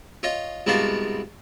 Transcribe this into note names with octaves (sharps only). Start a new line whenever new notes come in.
F4 C#5 D#5
C2 G#2 B3 F#4 F5 A5